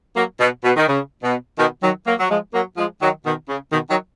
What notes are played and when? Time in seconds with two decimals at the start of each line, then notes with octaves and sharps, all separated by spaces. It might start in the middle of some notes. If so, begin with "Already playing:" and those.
0.16 F#3 A#3
0.40 B2
0.64 B2
0.76 D#3
0.87 C#3
1.23 B2
1.58 B2 D#3
1.82 D#3 F#3
2.06 F#3 A#3
2.19 F#3
2.30 F3 G#3
2.53 F#3 A#3
2.77 F3 G#3
3.01 D#3 F#3
3.25 B2 D#3
3.49 C#3
3.72 B2 D#3
3.90 D#3 F#3